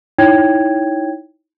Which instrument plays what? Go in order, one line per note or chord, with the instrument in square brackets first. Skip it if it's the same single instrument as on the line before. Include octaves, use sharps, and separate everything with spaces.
[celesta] D#4 E4 C#5 G5 G#6